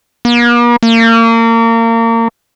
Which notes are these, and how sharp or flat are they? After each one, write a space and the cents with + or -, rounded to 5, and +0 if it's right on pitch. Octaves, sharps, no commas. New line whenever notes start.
A#3 +45
A#3 -30